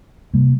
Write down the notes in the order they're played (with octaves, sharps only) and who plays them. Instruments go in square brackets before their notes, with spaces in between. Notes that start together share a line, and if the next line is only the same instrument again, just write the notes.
[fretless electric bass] C3 G3 A#3